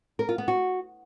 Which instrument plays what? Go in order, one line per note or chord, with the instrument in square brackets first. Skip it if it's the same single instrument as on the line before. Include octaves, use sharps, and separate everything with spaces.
[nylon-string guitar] A#4
F4
B3
F#4